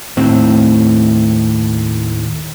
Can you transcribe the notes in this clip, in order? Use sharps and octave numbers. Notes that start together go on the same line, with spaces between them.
D#2 A2 C4